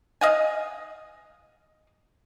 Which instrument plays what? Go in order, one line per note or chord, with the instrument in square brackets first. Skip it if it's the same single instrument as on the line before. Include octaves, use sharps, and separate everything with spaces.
[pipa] D#5 F5 F#5 G#5